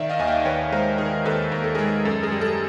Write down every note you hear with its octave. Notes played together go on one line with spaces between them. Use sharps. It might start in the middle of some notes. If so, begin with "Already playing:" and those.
Already playing: D#3 D5 E5
D#5 F5
D#2 G#5
F5 G5
D#2 B4 C#5
G#3 A#4 C5
D#3 G#4 A#4
D#2 A4 B4
D#2 A#4
A4
G#3 G#4 A#4
F#2 A4
G#4 A#4
G3
A4